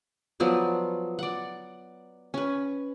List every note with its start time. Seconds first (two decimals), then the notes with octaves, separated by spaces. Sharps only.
0.40 F3 F#3 B3 D5
1.19 D5 F#5
2.34 C#4 B4